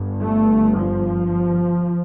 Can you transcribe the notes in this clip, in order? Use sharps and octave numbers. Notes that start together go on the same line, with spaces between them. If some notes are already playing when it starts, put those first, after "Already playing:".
Already playing: G1 G2
A3
F3